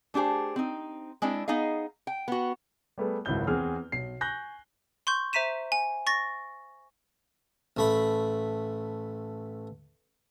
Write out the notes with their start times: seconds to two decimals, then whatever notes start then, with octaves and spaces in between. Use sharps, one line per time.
0.14 A3 D4 G4 G#4 C5
0.56 C4 D#4
1.22 G#3 C4 D4 E4
1.48 B3 D#4 G#4 D#5 F5
2.07 G5
2.28 B3 F#4
2.98 G3 A3 B3 G#4
3.25 G#1 C#2 F#2 E4 G6 G7
3.47 E2 C4 G#4 F6
3.92 B1 C7
4.21 G#5 C#6 F#6 G6 A#6
5.07 C6 C#6 G6
5.33 C5 E5 A#5 B6 D#7 E7
5.72 G#5
6.07 C#6 A6 A#6
7.77 A1 A3 B5